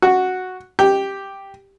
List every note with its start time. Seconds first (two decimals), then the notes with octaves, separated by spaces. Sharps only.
0.02 F#4
0.79 G4